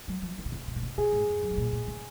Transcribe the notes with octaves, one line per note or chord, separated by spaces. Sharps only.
F#3
F3
D#3
C3
C#3
C3
A#2
C3
C3 G#4
G#2
F2
F#2
G#2
A#2
A#2
C#3